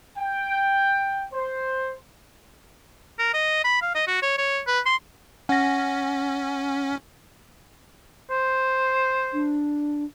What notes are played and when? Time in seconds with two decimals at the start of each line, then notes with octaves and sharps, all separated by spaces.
0.18 G5
1.33 C5
3.19 A#4
3.34 D#5
3.64 B5
3.82 F5
3.95 D#5
4.07 F#4
4.22 C#5
4.38 C#5
4.67 B4
4.86 C6
5.49 C#4 F#5 A#6
8.31 C5
9.33 D4